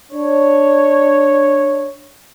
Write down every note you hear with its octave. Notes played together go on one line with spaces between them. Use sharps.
D4 C#5